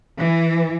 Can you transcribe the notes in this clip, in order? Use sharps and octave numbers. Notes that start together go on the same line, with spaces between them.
E3